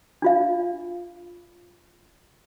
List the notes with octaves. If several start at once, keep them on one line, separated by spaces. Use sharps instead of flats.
D4 F4 F5